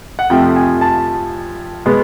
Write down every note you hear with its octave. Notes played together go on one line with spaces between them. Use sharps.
F#5
F2 C3 F3 A3 G5
G#5
A5
B2 G#3 B3